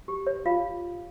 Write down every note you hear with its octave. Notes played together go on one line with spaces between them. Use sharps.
G4
C#5
F4 F5